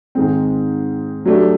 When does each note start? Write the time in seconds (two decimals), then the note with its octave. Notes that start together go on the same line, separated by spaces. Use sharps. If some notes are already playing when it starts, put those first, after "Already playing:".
0.15 G#2 D#3 G#3 C4
1.25 F#3 A3 D4 G4